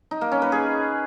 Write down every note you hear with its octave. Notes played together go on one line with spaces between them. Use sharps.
D#4
A#3
C#4
B4
G#4